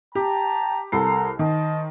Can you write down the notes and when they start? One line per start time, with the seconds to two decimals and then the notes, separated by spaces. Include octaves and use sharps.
0.15 G4 G5 A5 A#5
0.92 C2 A4 A#4 A#5 C7
1.39 D#3 C5 D#5 A5